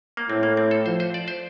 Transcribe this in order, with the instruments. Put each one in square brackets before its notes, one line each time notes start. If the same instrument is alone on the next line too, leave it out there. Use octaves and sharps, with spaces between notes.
[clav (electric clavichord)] A#3
[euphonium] A2 [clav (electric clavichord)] C4
[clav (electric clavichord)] A#3
C4
A4
[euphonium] F3 [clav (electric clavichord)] C5
[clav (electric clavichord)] C5
D5
C5